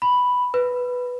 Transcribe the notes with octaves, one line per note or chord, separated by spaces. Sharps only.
B5
B4